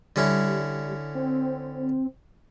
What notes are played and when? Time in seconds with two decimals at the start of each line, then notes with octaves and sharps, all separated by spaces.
0.16 D3 G3 C#4 E4
1.15 C4